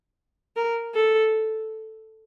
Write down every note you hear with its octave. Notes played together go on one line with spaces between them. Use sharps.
A#4
A4